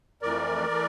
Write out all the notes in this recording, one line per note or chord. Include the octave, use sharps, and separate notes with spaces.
F2 E3 A3 A#4 D5
E3 A3